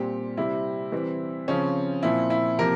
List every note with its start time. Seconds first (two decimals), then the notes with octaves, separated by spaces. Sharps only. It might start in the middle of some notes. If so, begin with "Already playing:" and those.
Already playing: A#2 G3 C4 G4
0.37 C3 G3 C4 E4
0.92 E3 G3 C4
1.48 C#3 F3 C4 C#4
2.03 A#2 F3 C4 E4
2.30 E4
2.58 C3 F3 A#3 A#4